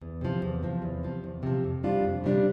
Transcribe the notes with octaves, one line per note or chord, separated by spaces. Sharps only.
E2
C3 F3
E2
C3 F3
E2
C3 F3
E2
C3 F3
F2
C3 G3 D4 F4
F2
C3 G3 D4 F4